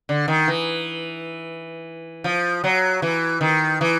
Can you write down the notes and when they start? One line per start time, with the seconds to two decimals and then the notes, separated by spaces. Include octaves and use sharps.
0.09 D3
0.28 D#3
0.48 E3
2.24 F3
2.64 F#3
3.02 E3
3.41 D#3
3.81 E3